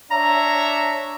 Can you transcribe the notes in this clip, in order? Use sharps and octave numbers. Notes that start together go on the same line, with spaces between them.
D4 C#5 E5 A#5